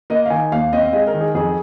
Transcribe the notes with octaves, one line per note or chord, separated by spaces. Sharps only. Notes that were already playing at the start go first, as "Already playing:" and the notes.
A#3 D#5
F5
D#3 G#5
D#2 F5
C4 D#5
F5
G#3 D#5
A#4
D#3
G#4
F2 G#4